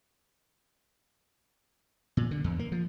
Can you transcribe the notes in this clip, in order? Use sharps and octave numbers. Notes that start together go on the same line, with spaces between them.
A#2
D3
E2
A#3
F3